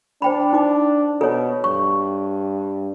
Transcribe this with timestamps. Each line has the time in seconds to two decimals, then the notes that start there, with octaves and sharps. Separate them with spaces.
0.22 D4 C5 G5 B5
0.53 D#4 D6
1.21 B2 A4 C#5
1.64 G2 C#6